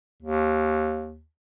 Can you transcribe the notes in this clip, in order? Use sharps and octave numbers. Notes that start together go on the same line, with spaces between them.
D#2